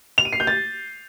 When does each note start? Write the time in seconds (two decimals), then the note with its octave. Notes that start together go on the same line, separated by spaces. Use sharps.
0.18 F7
0.25 D#7
0.33 C7
0.40 G6
0.47 A6